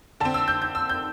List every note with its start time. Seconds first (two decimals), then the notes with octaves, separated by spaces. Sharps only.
0.20 D3 C4 A5
0.34 E6
0.48 G6
0.62 G6
0.75 E6
0.89 G6